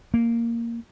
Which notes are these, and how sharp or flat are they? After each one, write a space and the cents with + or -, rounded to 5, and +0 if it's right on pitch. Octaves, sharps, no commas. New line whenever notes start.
A#3 -5